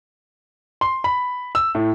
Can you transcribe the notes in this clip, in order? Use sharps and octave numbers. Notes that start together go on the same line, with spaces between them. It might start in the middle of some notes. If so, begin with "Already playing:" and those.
C6
B5
E6
A2